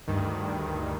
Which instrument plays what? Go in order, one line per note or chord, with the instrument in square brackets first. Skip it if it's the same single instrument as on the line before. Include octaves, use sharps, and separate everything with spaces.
[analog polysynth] D2 G2 D#3